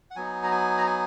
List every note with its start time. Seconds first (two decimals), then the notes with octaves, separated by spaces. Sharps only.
0.11 F#5
0.16 F#3 B3 D#4 G#5
0.44 A#5
0.51 G#5
0.78 A#5
0.87 G#5